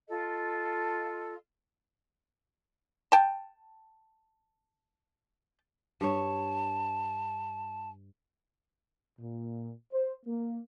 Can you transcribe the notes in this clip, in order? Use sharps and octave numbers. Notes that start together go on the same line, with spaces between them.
F4 A4 D#5
G5 A5
G2 C#5 A5
A#2
C5
A#3